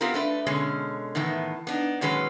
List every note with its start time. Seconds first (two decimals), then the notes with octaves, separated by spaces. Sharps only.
0.01 B3 C4 F4 G4 A#4
0.14 A3 D4 B4
0.47 B2 D3 G#3 C#4
1.15 A2 D#3 E3 B3
1.67 B3 D4 D#4
2.01 A#2 D#3 F#3 G#3 C#4 B4